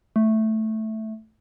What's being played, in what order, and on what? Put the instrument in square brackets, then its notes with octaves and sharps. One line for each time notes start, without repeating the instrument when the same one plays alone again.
[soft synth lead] A3